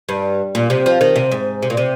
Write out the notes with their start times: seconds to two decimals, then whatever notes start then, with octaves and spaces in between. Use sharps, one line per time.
0.09 G2
0.55 A#2
0.70 C3
0.86 F3
1.01 D#3
1.16 C3
1.31 G#2
1.62 C3
1.70 A#2
1.77 C3